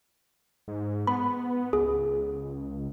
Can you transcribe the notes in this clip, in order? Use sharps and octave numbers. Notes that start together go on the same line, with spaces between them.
G#2
B3 B5
C#2 G#4